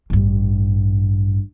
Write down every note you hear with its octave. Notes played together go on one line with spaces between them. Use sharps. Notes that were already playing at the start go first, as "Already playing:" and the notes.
A1 G2